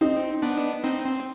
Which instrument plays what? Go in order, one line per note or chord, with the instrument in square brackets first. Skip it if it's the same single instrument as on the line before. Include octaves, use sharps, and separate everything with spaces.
[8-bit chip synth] C4 [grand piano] D#4
[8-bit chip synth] B3 D4
C4 D#4
C4